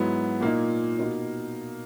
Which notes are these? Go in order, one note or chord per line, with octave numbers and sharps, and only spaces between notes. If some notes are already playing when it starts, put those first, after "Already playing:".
Already playing: G#2 F#3 B3 E4
A#2 A#3 D#4
B2 A#3 D#4